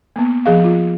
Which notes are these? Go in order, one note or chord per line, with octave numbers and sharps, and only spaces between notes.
A#3 B3
F3 G#4 F5
F4